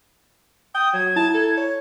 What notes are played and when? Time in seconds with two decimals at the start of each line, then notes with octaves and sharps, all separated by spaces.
0.74 G5 D#6
0.93 F#3 G#6
1.16 E4 A5
1.34 A4
1.58 C#5